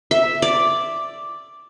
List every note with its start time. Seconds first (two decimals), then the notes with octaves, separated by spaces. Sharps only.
0.11 E5
0.42 D5